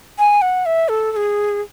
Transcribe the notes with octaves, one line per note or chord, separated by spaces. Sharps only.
G#5
F#5
E5
A4
A4
G#4